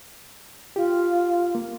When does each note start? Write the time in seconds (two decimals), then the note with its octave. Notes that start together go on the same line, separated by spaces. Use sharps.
0.76 F4 G4
1.55 A#3